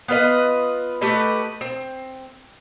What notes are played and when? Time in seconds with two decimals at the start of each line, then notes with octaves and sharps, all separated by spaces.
0.08 B3 F4 B4 D#5
1.01 A3 G4 B4 D#5
1.61 C4